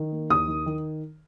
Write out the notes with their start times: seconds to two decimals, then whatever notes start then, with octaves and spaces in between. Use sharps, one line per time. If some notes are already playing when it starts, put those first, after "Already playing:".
Already playing: D#3
0.12 A#3
0.30 D#2 D#6
0.48 D#3
0.66 D#3